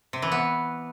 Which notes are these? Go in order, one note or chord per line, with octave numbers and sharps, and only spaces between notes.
C3
E3
B3